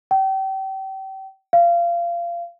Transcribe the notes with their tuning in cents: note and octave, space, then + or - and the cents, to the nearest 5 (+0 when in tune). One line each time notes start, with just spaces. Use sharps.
G5 -35
F5 -25